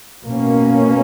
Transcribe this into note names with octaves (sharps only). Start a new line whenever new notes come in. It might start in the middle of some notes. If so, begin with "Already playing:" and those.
B2 A#3 C#4